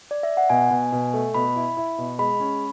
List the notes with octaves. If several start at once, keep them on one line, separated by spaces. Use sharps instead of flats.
D5
E5
F#5
B2 G#5
B2
B2
A3
B2 B5
E4
E4
B2
G#3 B5
C#4